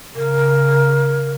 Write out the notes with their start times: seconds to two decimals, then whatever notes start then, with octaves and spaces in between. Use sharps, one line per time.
0.16 C#3 A#4